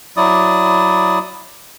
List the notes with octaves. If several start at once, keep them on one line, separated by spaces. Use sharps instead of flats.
F#3 E4 D5 D#6